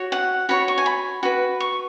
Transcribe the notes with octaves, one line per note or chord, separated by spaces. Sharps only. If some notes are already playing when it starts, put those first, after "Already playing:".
Already playing: F#4 C#5
F#5
F#4 C#5 B5
C#6
G#5
B5
F#4 B4
C#6